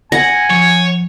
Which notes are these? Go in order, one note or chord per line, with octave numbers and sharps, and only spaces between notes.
F#5 G#5 A#6
F3 C#5